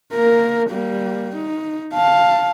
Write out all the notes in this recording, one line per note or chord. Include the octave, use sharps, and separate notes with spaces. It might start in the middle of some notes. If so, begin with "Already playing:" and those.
A#3 A#4
G3 A#3
D#4
F5 A5